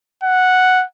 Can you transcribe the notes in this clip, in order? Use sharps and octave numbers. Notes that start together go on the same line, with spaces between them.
F#5